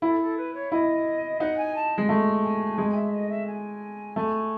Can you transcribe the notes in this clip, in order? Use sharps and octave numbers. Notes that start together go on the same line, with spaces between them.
E4 A4
A4
B4
C#5
E4 D#5
D#4 F#5
G#5
A5
G#3
A3
G#5
G#3 G#5
E5
D#5
E5
G#5
A3